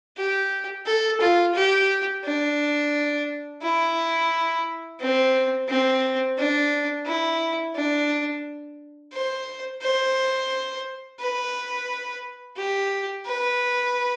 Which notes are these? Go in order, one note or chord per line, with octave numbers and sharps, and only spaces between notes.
G4
A4
F4
G4
D4
E4
C4
C4
D4
E4
D4
C5
C5
B4
G4
B4